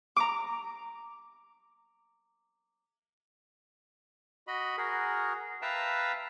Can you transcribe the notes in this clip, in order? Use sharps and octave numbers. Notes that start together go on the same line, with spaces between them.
A#5 D6
F#4 D#5 B5
F#4 G#4 A#4
B4 E5 F5 G5 A5 A#5